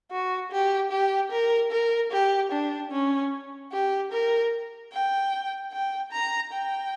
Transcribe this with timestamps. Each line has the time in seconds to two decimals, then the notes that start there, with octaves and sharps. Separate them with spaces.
0.11 F#4
0.52 G4
0.92 G4
1.32 A#4
1.72 A#4
2.12 G4
2.52 D4
2.92 C#4
3.72 G4
4.13 A#4
4.93 G5
5.73 G5
6.12 A#5
6.52 G5